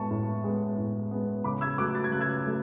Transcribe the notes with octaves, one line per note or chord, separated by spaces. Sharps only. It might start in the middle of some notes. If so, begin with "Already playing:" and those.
Already playing: A2 G#3 B3 A5 C#6
A2
G#3 B3
A2
G#3 B3
C#3 B5 D6
E6 G#6
F#3 A3 D6 F#6
A6
G#6
C#3 F#6
E6 G#6
F#3 A3